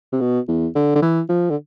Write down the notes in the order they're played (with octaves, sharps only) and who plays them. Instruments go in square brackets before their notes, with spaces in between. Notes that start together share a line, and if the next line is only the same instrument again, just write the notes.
[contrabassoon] C3
B2
E2
D3
D3
E3
F3
D3